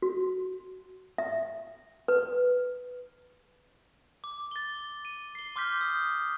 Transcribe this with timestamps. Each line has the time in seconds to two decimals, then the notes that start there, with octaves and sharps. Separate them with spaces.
0.02 F#4
1.18 E5
2.08 B4
4.24 D6
4.51 A6 G7
5.05 D#7
5.35 C7 G7
5.56 C6 D6 F6 G6 B6
5.81 D#6 G6